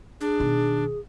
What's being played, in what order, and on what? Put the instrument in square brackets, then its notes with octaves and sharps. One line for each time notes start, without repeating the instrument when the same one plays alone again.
[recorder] D4 [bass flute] G#4
[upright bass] B2 D#3